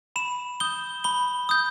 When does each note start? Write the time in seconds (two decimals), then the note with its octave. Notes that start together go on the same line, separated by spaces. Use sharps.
0.16 B5 E7
0.60 D#6 G6 G7
1.04 B5 G7
1.49 D#6 G6